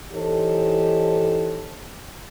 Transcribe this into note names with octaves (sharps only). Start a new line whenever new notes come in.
E3 D#4 G4 A4 C5 C#5